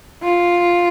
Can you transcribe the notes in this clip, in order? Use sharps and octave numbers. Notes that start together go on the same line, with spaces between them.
F4